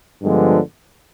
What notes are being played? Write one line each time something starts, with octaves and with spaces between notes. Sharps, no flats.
G2 D3 F3 G#3 B3